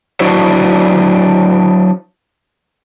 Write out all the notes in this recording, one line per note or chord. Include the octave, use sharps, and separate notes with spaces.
F#3 D4 E4 F#4 C5